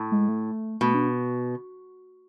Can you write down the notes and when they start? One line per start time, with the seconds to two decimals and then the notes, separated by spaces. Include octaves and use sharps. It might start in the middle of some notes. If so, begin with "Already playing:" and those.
Already playing: A2
0.12 G#3
0.28 A3
0.81 B2 A3
0.94 D4